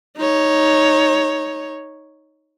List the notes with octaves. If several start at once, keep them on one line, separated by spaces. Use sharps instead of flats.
D#4 C#5